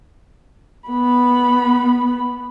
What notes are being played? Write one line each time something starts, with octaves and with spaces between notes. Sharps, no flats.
B3 B5